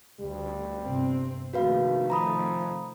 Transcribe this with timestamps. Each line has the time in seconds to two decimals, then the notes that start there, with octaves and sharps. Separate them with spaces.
0.20 D2 G3
0.84 G1 C3 C4
1.53 A#1 C3 D#3 A3 F#4 B4 F5
2.10 F3 A#5 B5 D#6